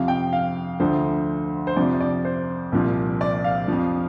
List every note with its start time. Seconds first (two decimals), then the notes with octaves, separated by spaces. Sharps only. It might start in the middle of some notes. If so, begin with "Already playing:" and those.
Already playing: F2 C3 F3 F5
0.08 G5
0.33 F5
0.79 D2 D3 F3 C5
1.67 C5
1.76 F2 C3 F3 D5
2.00 D5
2.25 C5
2.72 C2 A#2 F3
3.21 D5
3.44 F5
3.68 F2 F3